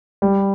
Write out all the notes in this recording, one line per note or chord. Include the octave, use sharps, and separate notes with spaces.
G3